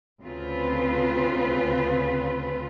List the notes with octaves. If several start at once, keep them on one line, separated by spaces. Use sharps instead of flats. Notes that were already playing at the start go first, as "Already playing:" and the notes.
D2 C#3 C4 F4 B4